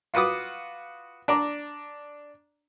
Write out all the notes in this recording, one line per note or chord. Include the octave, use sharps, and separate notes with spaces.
F4 F#4 B4 D6 D#6
D4 D5 A#5